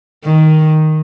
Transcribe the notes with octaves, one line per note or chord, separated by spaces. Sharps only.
D#3